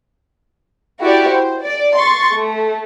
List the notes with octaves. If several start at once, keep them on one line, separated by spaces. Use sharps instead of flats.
E4 F#4 G4 D5
C5
D5
C6 C#6 A6
A3